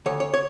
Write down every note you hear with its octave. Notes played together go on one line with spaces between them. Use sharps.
D2 C#5
C#5
C#5